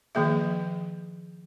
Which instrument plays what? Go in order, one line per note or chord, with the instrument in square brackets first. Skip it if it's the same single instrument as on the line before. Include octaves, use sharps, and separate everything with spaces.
[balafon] D#3 F3 A#3 G#4 E5